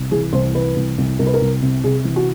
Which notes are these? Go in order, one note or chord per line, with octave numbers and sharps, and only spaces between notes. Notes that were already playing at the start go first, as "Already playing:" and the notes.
Already playing: C2
E3 G#4
C2 C5
E3 B4
C2
C2
C2 A#4
B4
A#4
C2
C3
C3 G#4
E3
F#4